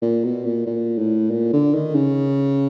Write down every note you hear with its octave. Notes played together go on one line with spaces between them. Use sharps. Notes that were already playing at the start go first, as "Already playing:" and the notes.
A#2
B2
A#2
A#2
A2
A#2
D3
D#3
C#3